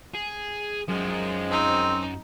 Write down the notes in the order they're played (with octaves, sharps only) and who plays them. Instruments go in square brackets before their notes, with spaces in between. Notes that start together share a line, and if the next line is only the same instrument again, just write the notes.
[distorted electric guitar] G#4
[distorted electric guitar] F#2 [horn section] D#3 F3 G#3
[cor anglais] C4 [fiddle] D#4